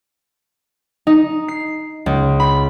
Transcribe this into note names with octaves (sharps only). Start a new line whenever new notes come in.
D#4
C7
C#2
B5